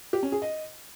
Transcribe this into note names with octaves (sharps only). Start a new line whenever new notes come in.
G4
C#4
G#4
D#5